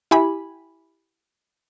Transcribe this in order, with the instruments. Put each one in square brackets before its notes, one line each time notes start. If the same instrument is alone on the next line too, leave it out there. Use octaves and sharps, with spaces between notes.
[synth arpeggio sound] E4 G4 G#5 B5